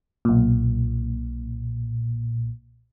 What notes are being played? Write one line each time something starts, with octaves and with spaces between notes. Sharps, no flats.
B1 A#2